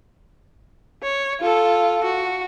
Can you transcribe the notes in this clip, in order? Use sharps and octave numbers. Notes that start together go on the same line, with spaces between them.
C#5
F4 A4
F#4